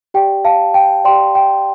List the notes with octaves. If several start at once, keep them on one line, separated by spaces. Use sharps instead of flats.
G4 D5 G5
F5 A5
G5
G4 D5 G5 C6
G5